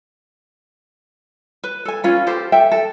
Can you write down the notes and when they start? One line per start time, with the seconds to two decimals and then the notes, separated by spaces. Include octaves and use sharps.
1.64 B4
1.85 A4 G#5
2.04 C#4 F4 B4
2.27 G4 A4 C5
2.52 A4 E5 G5
2.71 A4